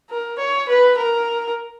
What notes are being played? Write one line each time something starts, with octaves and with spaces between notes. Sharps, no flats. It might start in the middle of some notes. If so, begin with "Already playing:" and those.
A#4
C#5
B4
A#4